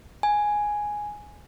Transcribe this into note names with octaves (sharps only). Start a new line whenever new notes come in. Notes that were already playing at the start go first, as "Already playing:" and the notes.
G#5